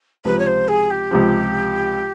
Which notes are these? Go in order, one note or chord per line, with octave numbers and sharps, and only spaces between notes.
C#2 C3 F3 B4
C#5
C5
G#4
G4
C#2 C3 F3